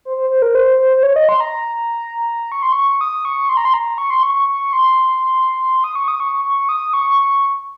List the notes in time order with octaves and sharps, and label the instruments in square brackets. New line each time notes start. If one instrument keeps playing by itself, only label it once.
[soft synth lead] C5
C5
C5
A#4
C5
C5
C5
C#5
D#5
C6
A#5
C#6
C6
C#6
D#6
C#6
C6
A#5
C6
A#5
C#6
C6
C#6
C#6
C#6
C6
D#6
C#6
D#6
C#6
C#6
C#6
D#6
C#6